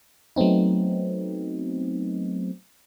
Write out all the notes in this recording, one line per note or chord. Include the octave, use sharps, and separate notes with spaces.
F#3 A3 B3 C4 D#4